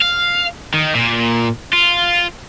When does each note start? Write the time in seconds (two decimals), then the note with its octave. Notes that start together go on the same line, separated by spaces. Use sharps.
0.02 F5
0.74 D#3
0.95 A#2
1.73 F4